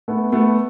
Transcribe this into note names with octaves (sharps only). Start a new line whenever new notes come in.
A3 B3
A3 B3